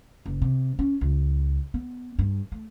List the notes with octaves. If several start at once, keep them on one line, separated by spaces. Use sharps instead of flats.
F#1
C3
C#4
C#2
B3
G2
A3